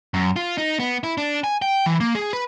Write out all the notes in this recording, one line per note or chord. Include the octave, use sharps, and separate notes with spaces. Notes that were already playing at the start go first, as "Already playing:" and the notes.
F#2
F4
D#4
B3
E4
D4
G#5
G5
E3
A#3
G#4
B4